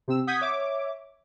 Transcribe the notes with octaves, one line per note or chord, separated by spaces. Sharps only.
C3 C4 E6
F#5 D#6 G6 G#6 B6
C#5 E5 D6